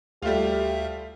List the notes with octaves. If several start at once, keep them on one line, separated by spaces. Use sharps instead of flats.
D2 G3 A3 F4 G4 E5